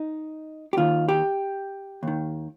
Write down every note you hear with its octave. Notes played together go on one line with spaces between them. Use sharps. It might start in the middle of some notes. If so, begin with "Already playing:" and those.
Already playing: D#4
G4
D#2 D#3 F4
G4
D#2 D#3